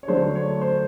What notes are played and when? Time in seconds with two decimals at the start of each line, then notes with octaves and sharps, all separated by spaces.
0.03 C#5
0.08 D3 F#3 A3 C5
0.35 C#5
0.62 C5